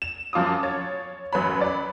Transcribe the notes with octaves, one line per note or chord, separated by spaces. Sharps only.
E7
F#2 F3 F4 D6 D#6
C#5 A6
A1 F#2 B4 C#5 B5
D5 B5